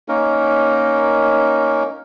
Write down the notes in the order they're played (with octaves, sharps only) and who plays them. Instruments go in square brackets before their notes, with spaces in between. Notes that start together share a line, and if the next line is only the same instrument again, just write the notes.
[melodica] A#3 C#4 D#4 A#4